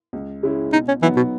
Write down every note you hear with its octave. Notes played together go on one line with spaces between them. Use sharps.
C#2
C#3 G#3 C#4 E4
B2 D#4
C#4
E3 F#3 B3 D#4
B2